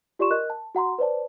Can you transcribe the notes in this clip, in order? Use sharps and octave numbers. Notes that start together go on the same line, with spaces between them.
F4 G4 D5 C6 C#6 E7
A#4 D#5 F#6
A5
F#4 F#5 A#5 C6
B4 C5 D5 A5